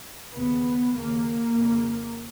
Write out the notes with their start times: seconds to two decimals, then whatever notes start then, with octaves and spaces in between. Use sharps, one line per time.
0.31 D#2 C#3 B3
0.93 D#2 C#3 A#3
1.56 F2 C#3